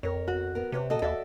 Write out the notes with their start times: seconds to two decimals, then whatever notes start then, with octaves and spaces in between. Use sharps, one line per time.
0.03 F2 A#4 C#5
0.28 F#4
0.55 B3 A#4
0.72 C3 C4 B4 C#5
0.90 A#2 F#4 A4 D#5
1.02 D#2 F#4 A4 D5 E5